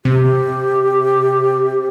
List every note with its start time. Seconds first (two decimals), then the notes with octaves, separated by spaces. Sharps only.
0.05 C3 G4